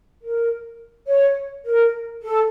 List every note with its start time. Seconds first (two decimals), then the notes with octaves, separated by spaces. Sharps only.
0.22 A#4
1.07 C#5
1.64 A#4
2.22 A4